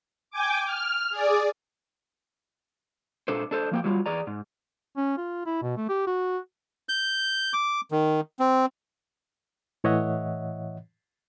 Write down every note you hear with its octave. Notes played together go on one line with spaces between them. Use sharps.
G5 G#5 D6
F6
G#4 D5
A#2 D4 A4 C5
D4 A4 C5
F3 A#3 G5
F#3 G3 F4
E2 G#4 D5 A#5
G#2
C#4
F4
E4
B2
A3
G4
F#4
G6
D6
D#3
C4
A2 E3 C#5 D#5 E5 F#5